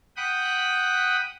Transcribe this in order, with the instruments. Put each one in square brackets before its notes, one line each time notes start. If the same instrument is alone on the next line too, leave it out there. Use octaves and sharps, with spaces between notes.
[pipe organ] F#5 G5 B5 D#6 F#6